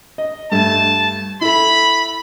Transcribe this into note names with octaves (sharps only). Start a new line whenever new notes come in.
D#5
G2 A3 A5
E4 A4 B5